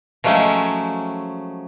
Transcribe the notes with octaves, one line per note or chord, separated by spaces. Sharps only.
F3 F#3 G#3 A3 C#4